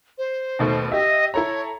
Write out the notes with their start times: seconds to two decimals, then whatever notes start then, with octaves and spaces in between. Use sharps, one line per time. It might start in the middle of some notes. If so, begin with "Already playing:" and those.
0.18 C5
0.59 D#2 B2 A3
0.92 G4 D#5 E5
1.34 E4 A4 C#5 A#5